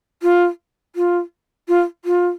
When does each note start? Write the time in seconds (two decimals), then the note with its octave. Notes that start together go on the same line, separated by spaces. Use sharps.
0.23 F4
0.96 F4
1.68 F4
2.05 F4